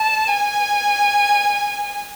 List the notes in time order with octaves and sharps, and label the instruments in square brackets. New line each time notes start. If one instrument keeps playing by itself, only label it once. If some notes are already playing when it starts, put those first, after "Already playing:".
Already playing: [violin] A5
G#5